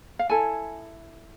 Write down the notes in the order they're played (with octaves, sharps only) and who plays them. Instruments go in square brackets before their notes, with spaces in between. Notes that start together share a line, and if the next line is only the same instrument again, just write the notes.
[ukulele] F5
E4 A4 G#5